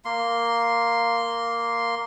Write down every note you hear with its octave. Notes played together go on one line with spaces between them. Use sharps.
A#3 C6